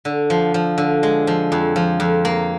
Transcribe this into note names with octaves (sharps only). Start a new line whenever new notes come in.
D3
F3
F3
D3
G#3
F3
F2
F3
F2
A#3